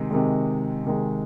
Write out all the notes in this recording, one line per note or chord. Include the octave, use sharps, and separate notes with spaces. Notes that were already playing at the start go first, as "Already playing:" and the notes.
Already playing: C3 D#3 G#3
C3 D#3 G#3
C3 D#3 G#3